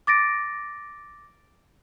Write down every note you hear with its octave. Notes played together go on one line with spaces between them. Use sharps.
D6 A6 A#6 D7